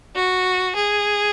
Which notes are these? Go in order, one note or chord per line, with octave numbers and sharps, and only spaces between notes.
F#4
G#4